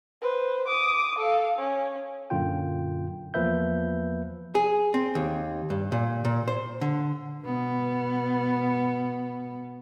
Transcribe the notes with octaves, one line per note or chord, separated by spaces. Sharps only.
B4 C5
D6 D#6
A4 F5
C#4
F#2 A#2 D3 F4 G5
E2 F3 A#3 B4 E5 G6
G#4
C4
D#2
G2
A#2
A#2
C5
D3
B2 B3